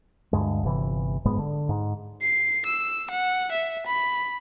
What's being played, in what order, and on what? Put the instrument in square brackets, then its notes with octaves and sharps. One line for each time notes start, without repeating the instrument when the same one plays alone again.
[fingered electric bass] D2 G2 G#3
G1 C3 E3
F#1 G#2 G#3 B3
D3
G#2
[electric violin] C7
E6
F#5
E5
B5